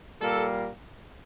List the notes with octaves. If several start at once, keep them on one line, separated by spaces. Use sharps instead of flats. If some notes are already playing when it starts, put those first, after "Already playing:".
A#2 G3 A#3 A4